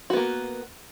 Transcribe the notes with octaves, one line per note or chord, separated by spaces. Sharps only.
A#3 B3 F#4